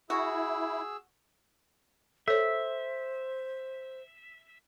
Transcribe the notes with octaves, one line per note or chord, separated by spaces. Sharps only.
E4 F#4 G#4 E6
A4 C5 C#5 E5